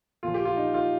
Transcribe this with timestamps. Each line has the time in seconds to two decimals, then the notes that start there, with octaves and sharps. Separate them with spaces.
0.23 A#2 F3 F4
0.34 G4
0.45 F4
0.57 D#4
0.74 F4